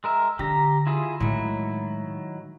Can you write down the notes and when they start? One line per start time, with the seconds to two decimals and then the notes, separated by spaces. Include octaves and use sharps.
0.04 G#3 A#4 E5
0.39 D3 G4 A#5
0.87 E4 F4 G#4
1.20 A2 D#3 F#3 G#3 E4